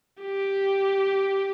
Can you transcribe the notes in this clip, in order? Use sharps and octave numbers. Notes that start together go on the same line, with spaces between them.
G4